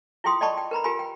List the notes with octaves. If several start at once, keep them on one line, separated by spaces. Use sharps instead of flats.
E4 F4 G#4 G5 C6 D#6
D5 D#5 G5 A5 B5 C#6
G5
A#4 B4 A#5 B5
F4 G4 A#4 G#5 B5
G5